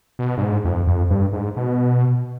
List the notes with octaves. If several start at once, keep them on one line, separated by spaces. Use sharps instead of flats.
B2
G2
G#2
F2
F2
G2
G#2
B2